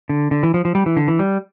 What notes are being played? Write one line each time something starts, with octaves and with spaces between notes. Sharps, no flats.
D3
D3
E3
F3
F3
G3
E3
D3
E3
G3